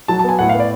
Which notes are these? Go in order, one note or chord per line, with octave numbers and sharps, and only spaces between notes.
F#3 A5
A5
B3 G#5
A2 F#5
F5
B3
D5